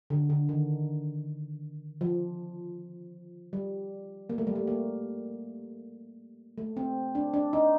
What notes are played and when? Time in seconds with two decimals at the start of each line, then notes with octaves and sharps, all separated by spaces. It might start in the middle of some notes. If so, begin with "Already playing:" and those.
0.10 D3
0.30 D3
0.49 D#3
2.01 F3
3.53 G3
4.30 A#3
4.38 A3
4.47 G3
4.55 A3
4.67 A#3
6.58 A3
6.77 C4
7.15 D4
7.34 D4
7.53 D#4